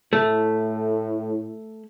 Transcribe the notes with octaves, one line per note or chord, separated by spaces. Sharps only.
A2 A3